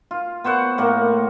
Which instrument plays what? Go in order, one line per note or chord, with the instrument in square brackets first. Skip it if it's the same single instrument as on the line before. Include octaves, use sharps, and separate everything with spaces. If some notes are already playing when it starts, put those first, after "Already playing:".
[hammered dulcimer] F4
B3 C5 C#5 F#5
A2 A#3 A#4